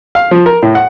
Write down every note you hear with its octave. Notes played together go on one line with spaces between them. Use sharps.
F5
F3
A#4
A2
F#5